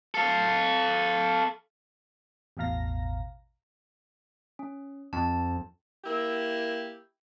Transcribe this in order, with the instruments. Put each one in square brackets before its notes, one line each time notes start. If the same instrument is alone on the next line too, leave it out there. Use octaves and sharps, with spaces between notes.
[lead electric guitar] A4 F5
[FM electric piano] A1 E2 B2 F5 A#5 A#6
[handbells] C#4
[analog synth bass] F2 [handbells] A5
[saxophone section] A#3 E4 G4 A#4